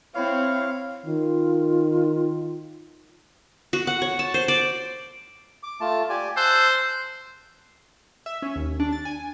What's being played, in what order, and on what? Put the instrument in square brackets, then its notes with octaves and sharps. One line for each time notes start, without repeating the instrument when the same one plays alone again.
[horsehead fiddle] C4 [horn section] E4 C#5 [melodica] F5
[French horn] D#3 [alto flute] F4
[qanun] F#4
F#5
C#5
A5
C5
D5
[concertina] D6
A3 F4 A5
G4 D5 G#5
[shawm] C5 [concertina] A5 E6 F#6
[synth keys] E5
C#4
D#2
D4
A6
G#5